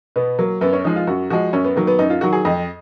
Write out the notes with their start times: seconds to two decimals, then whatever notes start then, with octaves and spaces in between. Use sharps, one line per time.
0.16 B2 B3
0.39 F#3 A#3
0.61 F#2 B3
0.73 C#4
0.84 F3 G#3 D#4
0.96 F4
1.07 F#2 F#4
1.30 F3 G#3 F#4
1.53 F#2 C#4
1.65 B3
1.76 D#3 F#3 A#3
1.87 B3
1.99 F#2 D#4
2.10 F4
2.21 D#3 F#3 F#4
2.33 G#4
2.45 F2 D#5